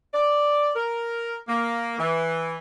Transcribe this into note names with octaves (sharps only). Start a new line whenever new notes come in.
D5
A#4
A#3
E3